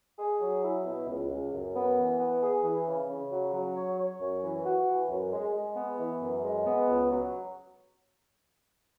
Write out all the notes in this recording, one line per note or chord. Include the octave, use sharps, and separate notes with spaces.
G#4
F#3
E4
B2
C#2
C#2
F#2
B3
E3
B3
G#4
E3
C#3
C#3
F#3
F#3
C#5
C#5
F#2
E3
F#4
E3
F#2
G#3
G#3
B3
E3
F#2
G#3
B3
C#2
F#3